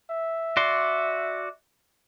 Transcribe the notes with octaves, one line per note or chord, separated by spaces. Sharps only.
E5
F#4 D5 C6